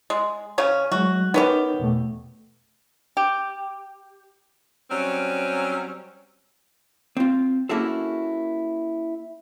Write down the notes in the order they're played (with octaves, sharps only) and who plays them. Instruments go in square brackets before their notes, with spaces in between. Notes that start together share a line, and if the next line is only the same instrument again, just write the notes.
[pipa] G#3
C#3 C#4
[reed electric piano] F#3 G#3 [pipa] F#4
[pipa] B3 C#4 G4 [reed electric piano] D#4 A#4
[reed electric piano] E2 B2 A3
[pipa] G4
[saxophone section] F#3 G3 C4 C#4
[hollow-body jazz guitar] C4 F4
A#3 C#4 E4 F#4 G#4 A4